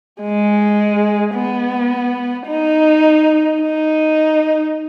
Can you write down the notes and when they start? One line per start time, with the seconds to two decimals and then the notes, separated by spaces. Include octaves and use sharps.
0.21 G#3
1.35 B3
2.48 D#4
3.62 D#4